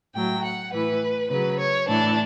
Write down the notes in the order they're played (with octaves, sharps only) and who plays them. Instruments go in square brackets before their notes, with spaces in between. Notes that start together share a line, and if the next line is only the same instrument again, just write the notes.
[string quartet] A2 F#3 G5
F#5
A2 E3 B4
C#3 F#3 B4
C#5
A2 E3 D4